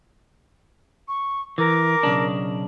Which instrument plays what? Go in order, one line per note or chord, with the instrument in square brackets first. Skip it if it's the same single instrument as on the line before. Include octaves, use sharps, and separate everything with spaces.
[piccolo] C#6
[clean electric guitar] E3 [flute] A#4 [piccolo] D6
[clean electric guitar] B1 C#3 D4